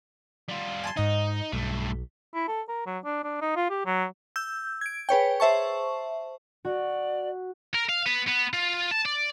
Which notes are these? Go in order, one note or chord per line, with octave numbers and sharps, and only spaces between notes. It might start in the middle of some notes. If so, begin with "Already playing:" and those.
G3 F4
G#5 A5 C6
G#2 D#4 D#5
B1 G2 A3
E4
A4
A#4
F#3
D4
D4
D#4
F4
G4
F#3
E6 G6
G#6 D7
G#4 B4 C#5 G5
C5 E5 A5 C#6
F#4 D5
A#4
F5
B3
B3
F4
A5
D5